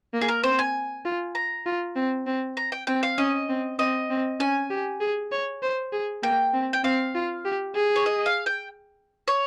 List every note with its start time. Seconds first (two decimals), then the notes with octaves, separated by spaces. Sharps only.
0.13 A#3
0.21 G#4
0.28 A#4
0.44 C4 C5
0.59 G#5
1.05 F4
1.35 A#5
1.66 F4
1.96 C4
2.27 C4
2.57 A#5
2.72 G5
2.87 C4 G5
3.03 F5
3.18 C#4 D#5
3.49 C4
3.79 C4 D#5
4.10 C4
4.40 C#4 G#5
4.70 G4
5.00 G#4
5.32 C#5
5.62 C5
5.92 G#4
6.23 A#3 G5
6.54 C4
6.73 G5
6.84 C4 F5
7.15 F4
7.45 G4
7.75 G#4
7.96 C#5
8.06 D#5
8.26 F5
8.46 G5
9.28 C#5